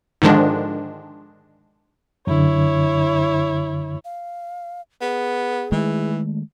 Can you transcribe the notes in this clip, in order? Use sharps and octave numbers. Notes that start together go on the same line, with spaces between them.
G#2 D3 D#3 F3 G#3 D4
F#2 D3 E4 C#5
F5
B3 G#4
D#3 E3 G#3 A3